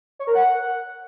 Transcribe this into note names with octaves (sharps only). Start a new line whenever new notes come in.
C#5
A#4
F#5